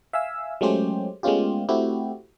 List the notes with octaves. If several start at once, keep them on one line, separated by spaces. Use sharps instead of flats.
E5 F5 G#5 E6
F#3 G#3 A3 C#4 G4 C5
G#3 A3 B3 C#4 F4 G4
A3 C4 E4 F#4 G4